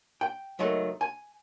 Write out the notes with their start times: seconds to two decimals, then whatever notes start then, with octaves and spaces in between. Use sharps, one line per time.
0.21 G5
0.59 C#2 D#3 F#3 A3
1.01 G#5